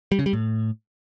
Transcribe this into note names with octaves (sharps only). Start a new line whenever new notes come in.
G3
C#3
G3
A2